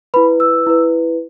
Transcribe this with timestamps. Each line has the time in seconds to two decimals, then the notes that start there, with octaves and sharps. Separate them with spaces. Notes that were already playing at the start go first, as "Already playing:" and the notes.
0.14 E4 B4 B5
0.40 E6
0.66 E4 B4